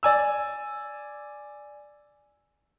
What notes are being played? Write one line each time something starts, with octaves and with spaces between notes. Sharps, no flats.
D5 G#5 E6